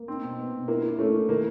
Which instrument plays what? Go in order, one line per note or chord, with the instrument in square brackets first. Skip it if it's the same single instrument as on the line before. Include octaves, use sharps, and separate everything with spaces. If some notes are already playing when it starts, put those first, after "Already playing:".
Already playing: [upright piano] A#3
[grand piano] C4 [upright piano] D#4
[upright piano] B2
B3
B2
[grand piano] A#3 [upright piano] E4
[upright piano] E4
[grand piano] A3 [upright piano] C#4
[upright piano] E4
[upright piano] D#3 [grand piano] A#3